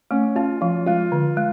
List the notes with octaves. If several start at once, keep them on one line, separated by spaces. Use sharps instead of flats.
A3 C#4
C#4 F4
F3 F4
G#3 F4
D3
G#3